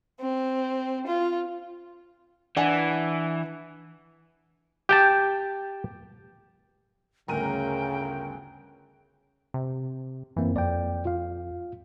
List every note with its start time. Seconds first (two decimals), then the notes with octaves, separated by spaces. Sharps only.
0.21 C4
1.06 F4
2.57 E3 D4 F#5 G#5
4.89 G4 G5 A5
7.28 G1 D2 C#3 A#4 G5 D#7
9.54 C3
10.36 F#2 E3 A#3 C4
10.56 F2 D5 G5
11.05 F4 F5